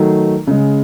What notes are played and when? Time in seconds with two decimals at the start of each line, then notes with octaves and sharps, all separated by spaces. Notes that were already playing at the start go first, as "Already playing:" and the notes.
Already playing: D#3 F#3 A3
0.47 C#3 G#3